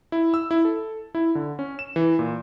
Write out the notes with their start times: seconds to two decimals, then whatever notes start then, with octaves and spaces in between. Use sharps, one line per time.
0.12 E4
0.34 E6
0.51 E4
0.65 A4
1.15 E4
1.35 D3
1.59 C#4
1.79 E7
1.96 E3
2.19 A#2